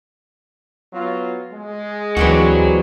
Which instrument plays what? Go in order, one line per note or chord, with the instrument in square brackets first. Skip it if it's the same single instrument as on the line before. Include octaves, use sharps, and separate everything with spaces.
[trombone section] F#3 B3 F4
G#3
[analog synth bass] D2 [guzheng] E3 G3 C4 [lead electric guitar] F#3 F#4